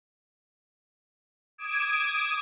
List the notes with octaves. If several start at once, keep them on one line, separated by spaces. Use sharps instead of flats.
D6 D#6 G#6 D7 E7